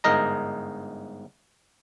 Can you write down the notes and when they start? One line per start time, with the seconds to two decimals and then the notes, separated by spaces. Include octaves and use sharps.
0.04 G1 G#2 A#4 D#5 A#5